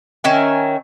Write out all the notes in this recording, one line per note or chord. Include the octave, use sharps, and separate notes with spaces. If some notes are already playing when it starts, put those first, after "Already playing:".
D#3 C#4 E5 G#5